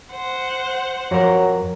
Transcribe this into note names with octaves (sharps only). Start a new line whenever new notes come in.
C5 F#5
F2 F#3 A#4